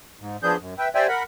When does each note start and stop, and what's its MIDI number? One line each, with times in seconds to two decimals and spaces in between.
0.20 0.37 44
0.43 0.57 53
0.43 0.57 59
0.43 0.57 62
0.43 0.57 68
0.43 0.57 91
0.59 0.74 42
0.78 0.88 71
0.78 0.88 76
0.78 0.88 79
0.95 1.07 67
0.95 1.07 72
0.95 1.07 74
0.95 1.07 76
0.95 1.07 79
0.95 1.07 80
1.08 1.23 70
1.08 1.23 78
1.08 1.23 83